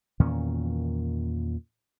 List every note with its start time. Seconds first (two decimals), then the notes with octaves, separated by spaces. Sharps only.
0.20 E2 A#2 D#3 C#4